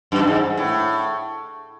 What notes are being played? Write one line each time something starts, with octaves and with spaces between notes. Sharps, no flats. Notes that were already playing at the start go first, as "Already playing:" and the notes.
F#2
G2
G#2
A2